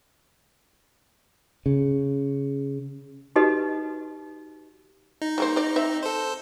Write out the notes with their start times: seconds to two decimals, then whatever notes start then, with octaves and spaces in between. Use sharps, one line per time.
1.66 C#3
3.36 D#4 F#4 G4 A4 B4 D#5
5.22 D#4
5.38 G3 A#3 C5
5.56 C5 D5
5.76 C4 E5
6.03 A4 C5